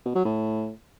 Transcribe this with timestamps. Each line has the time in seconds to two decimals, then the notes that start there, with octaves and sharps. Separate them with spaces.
0.06 B2
0.15 F#3
0.25 A2